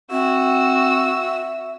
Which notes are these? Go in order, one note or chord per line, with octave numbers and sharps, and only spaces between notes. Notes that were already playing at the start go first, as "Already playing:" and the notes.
C4 F#4 E5 E6